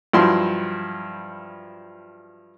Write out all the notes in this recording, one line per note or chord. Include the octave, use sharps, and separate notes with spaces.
G2 F3 F#3 E4 C6